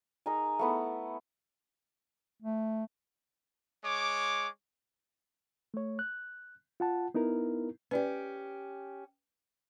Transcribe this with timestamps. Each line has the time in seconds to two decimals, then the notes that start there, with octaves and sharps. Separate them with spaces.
0.26 D#4 G#4 A#4 G#5
0.59 A3 B3 E4
2.42 A3
3.84 G#3 C#5 D6
5.74 A3 C#5
5.99 F#6
6.80 F4 F#5 A5
7.14 B3 D#4 E4 A#4
7.91 C#4 G4 B4 D5